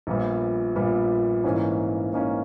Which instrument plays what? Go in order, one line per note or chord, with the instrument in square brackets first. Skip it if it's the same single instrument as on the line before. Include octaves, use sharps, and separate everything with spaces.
[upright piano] A#1 A#2 G3 B3
A#1 A#2 G3 B3
G#2 E3 A#3 C#4
G#2 E3 A#3 C#4